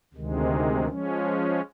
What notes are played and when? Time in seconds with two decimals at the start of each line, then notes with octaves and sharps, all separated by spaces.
0.14 D2 C3 D#3 G#3
0.88 F3 G#3 C#4